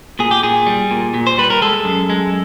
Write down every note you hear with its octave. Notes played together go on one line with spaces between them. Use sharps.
A#2 G#4
G4
A#2 G#4
G3
A#2
A#2
C5
G3 B4
A#4
G#3 A4
F#2
G#3